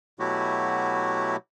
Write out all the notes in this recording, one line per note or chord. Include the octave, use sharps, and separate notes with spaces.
B2 F#3 A3 E4 F#4 G4